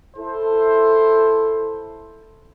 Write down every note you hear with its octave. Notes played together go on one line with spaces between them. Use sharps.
E4 A4 C5